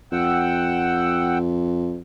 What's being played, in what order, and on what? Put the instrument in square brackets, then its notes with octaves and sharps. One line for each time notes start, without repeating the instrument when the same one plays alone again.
[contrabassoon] F2 [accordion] F#5 G5 E6